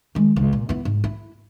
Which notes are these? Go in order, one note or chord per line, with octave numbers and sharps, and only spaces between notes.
D#3 G#3
G1 C#2
A#2
B3 E4
G#2
E4